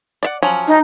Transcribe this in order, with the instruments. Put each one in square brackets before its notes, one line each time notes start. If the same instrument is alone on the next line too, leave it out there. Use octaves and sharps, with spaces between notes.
[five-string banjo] D5 E5 F#5
F3 F#3 C#4
[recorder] D#4